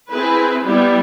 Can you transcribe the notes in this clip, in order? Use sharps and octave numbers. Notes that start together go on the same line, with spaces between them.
C4 E4 G#4 B4
G3 B3 E4